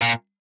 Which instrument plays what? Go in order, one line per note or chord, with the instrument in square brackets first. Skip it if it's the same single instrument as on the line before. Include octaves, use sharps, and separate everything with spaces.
[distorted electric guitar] A#2